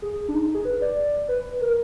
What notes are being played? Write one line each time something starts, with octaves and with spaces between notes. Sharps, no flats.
G#4
D4
D#4
D#4
G#4
B4
D5
B4
A#4